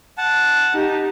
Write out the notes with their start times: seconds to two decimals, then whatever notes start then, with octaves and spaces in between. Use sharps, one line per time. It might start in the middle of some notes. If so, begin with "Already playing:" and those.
0.18 F#5 A5
0.74 D#4 G4